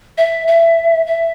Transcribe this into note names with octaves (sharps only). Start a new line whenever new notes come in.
E5
E5
E5